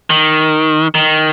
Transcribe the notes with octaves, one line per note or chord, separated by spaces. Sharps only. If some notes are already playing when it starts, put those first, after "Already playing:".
D#3
D#3